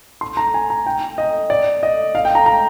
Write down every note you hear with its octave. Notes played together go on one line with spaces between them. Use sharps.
C6
A#5
G#5
A#5
G5
D#5
D5
D#5
F5
G5
A#5
A#5